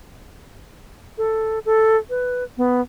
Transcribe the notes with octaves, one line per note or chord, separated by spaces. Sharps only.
A4
A4
B4
B3